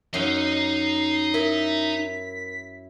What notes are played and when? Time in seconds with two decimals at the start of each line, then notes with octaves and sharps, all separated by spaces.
0.14 F#2 D#4 D#5 C7
1.34 E4 A#4 B6